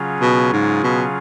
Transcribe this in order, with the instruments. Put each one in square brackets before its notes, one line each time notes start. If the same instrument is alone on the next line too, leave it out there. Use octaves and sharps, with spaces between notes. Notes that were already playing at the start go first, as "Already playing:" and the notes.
Already playing: [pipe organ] C#3 F#3 C#4 F4 G#4
[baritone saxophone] B2
G#2
B2